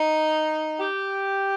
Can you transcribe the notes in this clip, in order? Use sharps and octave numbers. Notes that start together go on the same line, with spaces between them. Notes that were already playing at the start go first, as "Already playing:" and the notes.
Already playing: D#4
G4